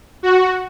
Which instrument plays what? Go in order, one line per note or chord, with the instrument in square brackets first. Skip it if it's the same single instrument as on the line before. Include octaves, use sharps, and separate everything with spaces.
[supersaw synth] F#4